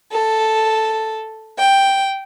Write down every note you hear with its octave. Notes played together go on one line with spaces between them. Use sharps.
A4
G5